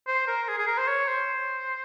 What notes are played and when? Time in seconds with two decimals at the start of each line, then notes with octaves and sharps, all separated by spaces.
0.07 C5
0.28 A#4
0.48 G#4
0.58 G#4
0.67 A#4
0.78 C5
0.88 C#5
1.08 C5